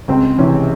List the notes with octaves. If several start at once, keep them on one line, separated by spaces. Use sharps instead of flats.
C#2 C4
C3 E3 C#4